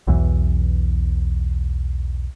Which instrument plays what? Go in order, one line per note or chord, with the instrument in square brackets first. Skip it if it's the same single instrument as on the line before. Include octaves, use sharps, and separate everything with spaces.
[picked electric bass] B1 E2 E3